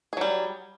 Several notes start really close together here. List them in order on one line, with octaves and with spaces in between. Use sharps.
G#4 F#3 G3